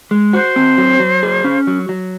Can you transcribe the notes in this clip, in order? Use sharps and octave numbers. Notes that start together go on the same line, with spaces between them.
G#3
F#4 C5
C4
F#3
F#3
G#4
C#4
F#3
F#3